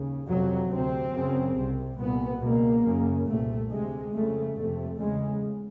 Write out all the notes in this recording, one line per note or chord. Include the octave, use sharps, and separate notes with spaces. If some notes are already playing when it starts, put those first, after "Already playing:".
Already playing: D#2 C#3
F2 C3 F#3
D2 C3 C4
F#2 C#3
C2 C3
C2 A#2 B3
C#2 B2 A#3
F#2 C#3
C2 A#2 A3
D2 C3 G#3
F2 C#3 A3
F2 C3 A3
E2 C#3 G#3